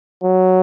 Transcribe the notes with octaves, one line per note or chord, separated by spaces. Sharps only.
F#3